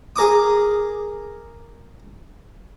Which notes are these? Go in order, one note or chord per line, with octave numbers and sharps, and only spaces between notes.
G#4 A#4 D6 D#6